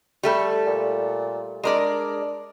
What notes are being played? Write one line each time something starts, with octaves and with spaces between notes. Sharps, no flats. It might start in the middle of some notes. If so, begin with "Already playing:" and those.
G3 A3 A4
A#2
G#3 D4 A#4 D5